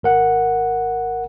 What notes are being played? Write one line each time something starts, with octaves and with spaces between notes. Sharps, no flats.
G#1 A#4 F#5